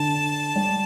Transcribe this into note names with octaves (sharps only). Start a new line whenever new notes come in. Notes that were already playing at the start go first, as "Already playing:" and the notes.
Already playing: D3 A5
G3